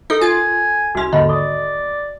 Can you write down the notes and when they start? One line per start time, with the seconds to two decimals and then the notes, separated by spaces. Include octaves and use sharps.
0.10 D#4 A4 A#4
0.21 F4 G#5
0.95 C2 C#4 F#4 C6
1.13 D#2 G#2 D3 D#5 B5
1.29 D5 C#6 D#6